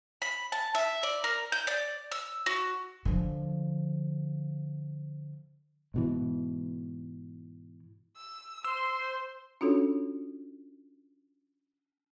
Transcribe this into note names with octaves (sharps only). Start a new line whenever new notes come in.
B5
A5
E5
D5
A#4
G6
D5
E6
F#4
D3 F3
G#2 B2 E3
E6
C5 C6 E6
C#4 D4 F4 F#4 A4 C#5